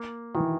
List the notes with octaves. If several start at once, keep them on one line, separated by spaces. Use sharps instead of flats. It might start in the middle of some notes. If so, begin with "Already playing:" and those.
Already playing: A#3
D#3 E3